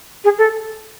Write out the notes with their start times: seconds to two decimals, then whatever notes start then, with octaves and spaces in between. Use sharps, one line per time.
0.24 G#4
0.38 A4